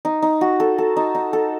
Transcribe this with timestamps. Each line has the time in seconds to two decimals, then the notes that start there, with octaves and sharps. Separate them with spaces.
0.05 D#4
0.22 D#4
0.41 F#4
0.60 A4
0.78 A4
0.97 D#4
1.15 D#4
1.33 A4